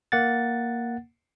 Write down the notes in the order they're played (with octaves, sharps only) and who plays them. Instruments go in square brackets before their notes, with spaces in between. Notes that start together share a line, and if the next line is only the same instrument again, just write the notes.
[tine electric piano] A#3 F#5 A6